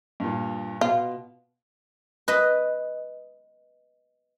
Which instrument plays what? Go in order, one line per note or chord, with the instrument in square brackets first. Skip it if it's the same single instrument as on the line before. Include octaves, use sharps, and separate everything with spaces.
[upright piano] G2 A#2
[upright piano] B2 [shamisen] F4
[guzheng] B4 D#5